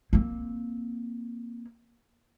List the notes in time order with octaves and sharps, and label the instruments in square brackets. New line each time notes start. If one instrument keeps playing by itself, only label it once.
[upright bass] A#3 C4